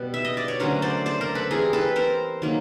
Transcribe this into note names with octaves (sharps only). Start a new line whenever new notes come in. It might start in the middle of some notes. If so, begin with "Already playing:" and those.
Already playing: B2 G3 B3
E5
D#5
D5
C#5
D3 F#3 A3 C#4 A#4 C5
C5 D5
C5 D5
A#4 C5
A4 B4
E3 G3 C4 G#4 A#4
A4 B4
A#4 C5
D#3 F#3 A#3